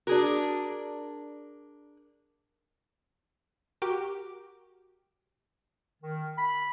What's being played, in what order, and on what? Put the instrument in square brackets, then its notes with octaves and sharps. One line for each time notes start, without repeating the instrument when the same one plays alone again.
[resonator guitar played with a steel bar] D4 G#4 A#4 [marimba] F#4
[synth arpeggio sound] F#4 G4 A#4 D6
[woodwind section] D#3
B5